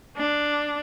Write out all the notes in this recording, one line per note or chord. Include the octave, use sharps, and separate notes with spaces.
D4